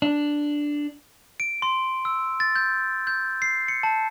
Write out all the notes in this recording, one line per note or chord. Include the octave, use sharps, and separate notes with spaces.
D4
D7
C6
E6
A6
G6
G6
C7
C#7
A5